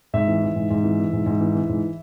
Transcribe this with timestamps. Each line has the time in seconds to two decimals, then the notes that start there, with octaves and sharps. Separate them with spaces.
0.14 G#2 E5
0.28 E3
0.42 E3
0.56 G#2
0.70 G#2
0.84 E3
0.98 E3
1.13 G#2
1.26 G#2
1.40 E3
1.55 E3
1.69 G#2